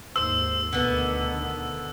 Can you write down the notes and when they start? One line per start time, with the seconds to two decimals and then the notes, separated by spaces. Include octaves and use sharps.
0.16 D#2 G#2 C5 E6
0.73 D2 B2 D3 D#3 B3